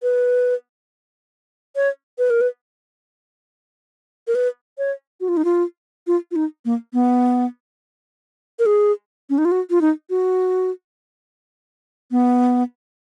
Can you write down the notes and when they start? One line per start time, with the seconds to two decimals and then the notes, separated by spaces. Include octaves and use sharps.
0.03 B4
1.76 C#5
2.18 B4
2.30 A#4
2.41 B4
4.27 A#4
4.35 B4
4.78 C#5
5.21 F#4
5.29 F4
5.37 D#4
5.45 F4
6.07 F4
6.31 F4
6.36 D#4
6.65 A#3
6.93 B3
8.59 A#4
8.66 G#4
9.30 C#4
9.38 D#4
9.45 F4
9.52 F#4
9.70 F4
9.81 D#4
10.10 F#4
12.11 B3